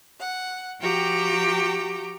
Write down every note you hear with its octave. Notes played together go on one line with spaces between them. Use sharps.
F#5
F3 F#4 G4 G5 A#5